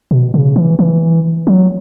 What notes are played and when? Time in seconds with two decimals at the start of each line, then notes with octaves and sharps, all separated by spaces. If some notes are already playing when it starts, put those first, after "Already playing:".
0.11 B2
0.34 C#3
0.56 E3
0.79 E3
1.47 F#3